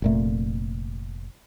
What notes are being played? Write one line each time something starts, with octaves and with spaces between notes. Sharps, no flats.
F1 A#2 A3